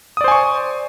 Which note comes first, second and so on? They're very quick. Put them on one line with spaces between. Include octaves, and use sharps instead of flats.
D#6 D5 C5 G#5 C#6